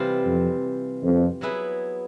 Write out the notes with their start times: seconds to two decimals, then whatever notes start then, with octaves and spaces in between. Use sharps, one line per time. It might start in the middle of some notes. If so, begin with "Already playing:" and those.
Already playing: C3 E3 G3 C4 F4
0.26 F2
1.04 F2
1.41 F#3 B3 E4 G#4 B4